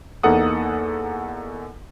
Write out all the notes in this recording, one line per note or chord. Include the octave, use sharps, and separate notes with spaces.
E2 A#3 D#4 A4 F#5 D#6